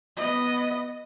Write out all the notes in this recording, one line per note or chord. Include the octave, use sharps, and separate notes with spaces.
B3 D#5